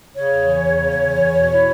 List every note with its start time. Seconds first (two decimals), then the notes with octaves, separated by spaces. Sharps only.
0.15 C#3 C#5
0.30 E2
0.45 E3
0.60 E2
0.75 C#3
0.90 E2
1.06 E3
1.21 E2
1.36 B2
1.52 E4